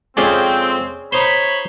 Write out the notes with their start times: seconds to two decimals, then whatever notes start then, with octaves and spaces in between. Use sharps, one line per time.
0.17 F2 G#3 C4 C#4 G#4 D5
1.13 D#4 C5 C#5 B5